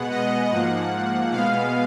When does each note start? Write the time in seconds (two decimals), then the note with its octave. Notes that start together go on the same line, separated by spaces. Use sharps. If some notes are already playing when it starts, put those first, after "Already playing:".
Already playing: B2 G#3 B3 F#5
0.10 D#5
0.50 G#2 F3 A#3 F#5
1.32 B2 G#3 B3 F5